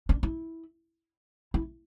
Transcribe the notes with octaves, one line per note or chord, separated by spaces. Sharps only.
D4
E4
E4